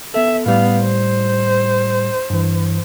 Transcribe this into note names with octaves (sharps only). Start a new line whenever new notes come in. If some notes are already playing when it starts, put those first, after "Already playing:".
B3 A4 E5
A2 G3 B3 F5
C5
G2 E3